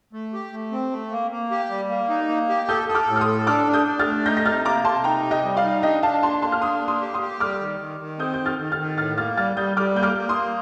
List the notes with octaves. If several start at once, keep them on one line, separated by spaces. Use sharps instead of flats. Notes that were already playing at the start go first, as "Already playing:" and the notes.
A3
G4
A3
C4
A3
A#3
A#3
G4
G3
A#3
D#4
A#3
G4
A4 D#6 G6
A4 D#6
D6 F6
A2
F6
C6 D#6
A4
D4 D6 F6
D4
D#6 G6
D4
F6 A6
A3
D#4 G6 A#6
A#6
C3 F6 A6
A#3 A#5 D6
C3 A5 C6
D#4 G5 A#5
C3
D#5 G5
G3
D5 F5
D#4
D4 D#5 G5
D4 F5 A5
A#3 A5 C6
A#3 A5 C6
F6
D4 C6 D#6
A#3
C6 D#6
G4
C6 D#6
G4
G3 D6 F6
D#3
D#3
D#3
C4 D#6 G6
G6
D#3
F6 A6
D#3
F6 A6
D#3
A2 F6 A6
A#3 F6 A6
G3 F6 A6
G3 D#6 G6
G3 D6 F6
A#3 G6
D6 F6
A#3
C6 D#6
A#3